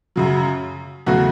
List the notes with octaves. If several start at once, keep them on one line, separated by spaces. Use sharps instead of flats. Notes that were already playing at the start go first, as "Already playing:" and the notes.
F#2 C#3 F#3
E2 C#3 F#3 A3 F#4